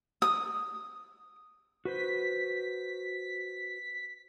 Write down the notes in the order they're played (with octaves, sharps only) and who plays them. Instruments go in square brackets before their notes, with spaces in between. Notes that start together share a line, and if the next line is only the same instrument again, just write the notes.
[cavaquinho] D#6
[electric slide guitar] F#4 B4 C5 [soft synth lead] B6